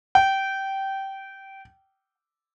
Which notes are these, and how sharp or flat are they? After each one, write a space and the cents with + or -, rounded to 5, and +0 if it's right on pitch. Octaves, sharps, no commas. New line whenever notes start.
G5 -15